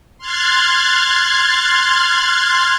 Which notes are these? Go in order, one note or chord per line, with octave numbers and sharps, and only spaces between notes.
C6 F6 F#6 G#6 A6